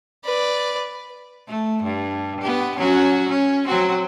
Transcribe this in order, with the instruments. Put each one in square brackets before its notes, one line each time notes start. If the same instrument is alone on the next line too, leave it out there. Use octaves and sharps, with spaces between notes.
[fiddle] B4 D5
[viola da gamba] A3
G2
B3 G4
F#3 C#4 F#4
C#4
F#3 C4 F#4